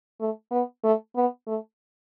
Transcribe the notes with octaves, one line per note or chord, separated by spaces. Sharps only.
A3
B3
A3
B3
A3